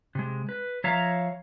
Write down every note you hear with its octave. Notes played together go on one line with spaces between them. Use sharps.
C3 G#3
B4
F3 C#5 E5 F5 A#5